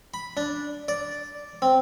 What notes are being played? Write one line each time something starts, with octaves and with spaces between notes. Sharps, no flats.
B5
D4
D5
C4